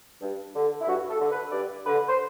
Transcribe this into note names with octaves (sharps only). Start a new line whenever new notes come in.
G2
D3
E4
G2 F#4
A4
D3
B4
G2 D5
D3 B4
C5